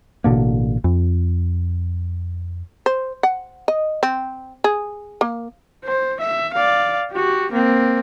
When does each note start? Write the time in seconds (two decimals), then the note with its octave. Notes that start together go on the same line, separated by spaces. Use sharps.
0.24 A1 B2 D3 A#3
0.84 F2
2.86 C5
3.23 F#5
3.68 D#5
4.03 C4
4.64 G#4
5.21 A#3
5.84 C5
6.21 E5
6.54 D5 F5
7.12 F#4 G4
7.52 A#3 C4